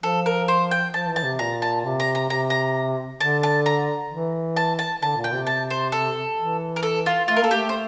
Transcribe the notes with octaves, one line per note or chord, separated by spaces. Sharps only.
F3 A4
A#4
C5
G5
F3 A5
E3
A5
C3
A#2 A#5
A5
C3
A#5
A#5
C3 A#5
A#5
D3 A5
A5
A#5
E3
A5
A5
D3 A5
A#2
G5
C3
A5
C5
A4
E3
A#4
A4
F4
A3 F4
A#4
A#3 A4
A3 G4
C5